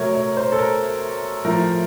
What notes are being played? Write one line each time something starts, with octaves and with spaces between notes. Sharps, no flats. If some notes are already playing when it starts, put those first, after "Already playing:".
Already playing: C3 F#3 A3 A#4 C#5
C#5
C5
A4
A#4
A2 F3 A3 A#4